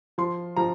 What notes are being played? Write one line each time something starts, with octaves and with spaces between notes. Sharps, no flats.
F3 C6
F3 A#5